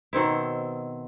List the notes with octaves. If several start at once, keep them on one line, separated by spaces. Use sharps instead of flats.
B2 D#3 C4 E4